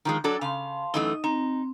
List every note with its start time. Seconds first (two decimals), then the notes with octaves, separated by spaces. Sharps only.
0.05 D#3 F3 G#3
0.24 F#3 D4 A4
0.41 C#3 F5 A5 C6
0.94 F#2 E3 A3 D#4 D#5
1.24 C4 D#4